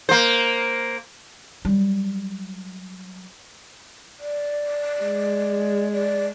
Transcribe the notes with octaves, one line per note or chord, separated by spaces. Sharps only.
A#3 C5
F#3 G3
D5
G#3
D5